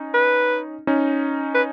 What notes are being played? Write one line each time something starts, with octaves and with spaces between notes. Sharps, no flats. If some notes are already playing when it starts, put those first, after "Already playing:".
Already playing: C#4 D#4
B4
C#4 D#4
B4